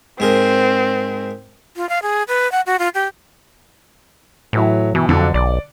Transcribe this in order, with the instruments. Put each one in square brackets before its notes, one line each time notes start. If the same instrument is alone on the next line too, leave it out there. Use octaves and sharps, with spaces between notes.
[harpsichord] G#2 G#4 A#4 [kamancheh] C4
[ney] F4
F5
G#4
B4
F#5
F#4
F4
G4
[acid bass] A2 [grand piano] E3 F#3 E4
[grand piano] B2 [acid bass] E3
[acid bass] F2 [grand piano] D3 F#3 D4
[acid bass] B1 [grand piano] D5